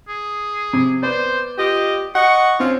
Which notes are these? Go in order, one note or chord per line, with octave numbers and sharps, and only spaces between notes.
G#4
C3
B3 C5 D5
F4 G4 D#5
D#5 F#5 C#6
C4 C#4 F4